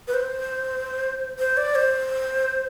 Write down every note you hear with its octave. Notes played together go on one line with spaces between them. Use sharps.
B4
C5
C5
D5
C5